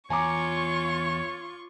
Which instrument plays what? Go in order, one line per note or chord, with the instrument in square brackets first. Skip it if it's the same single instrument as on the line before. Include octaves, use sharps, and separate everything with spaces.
[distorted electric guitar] E2 [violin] F4 C#6 [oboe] C#5 [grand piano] G#5 A#5 D6